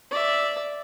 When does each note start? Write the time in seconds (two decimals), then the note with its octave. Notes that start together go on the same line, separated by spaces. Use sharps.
0.11 D5 E5